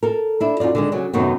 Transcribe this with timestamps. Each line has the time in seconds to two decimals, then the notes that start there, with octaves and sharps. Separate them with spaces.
0.03 A4 A#4
0.40 D4 E4
0.60 F#2 D#4 F4 D5
0.75 D3 D#3 G#3
0.92 C#3 F#3
1.13 F#2 C3 D#3 F#3 A3 B3